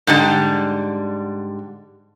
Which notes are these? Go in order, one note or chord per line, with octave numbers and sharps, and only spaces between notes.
G#2 D3 G3